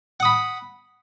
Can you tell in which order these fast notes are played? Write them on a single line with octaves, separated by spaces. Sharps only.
F#5 D#6 B5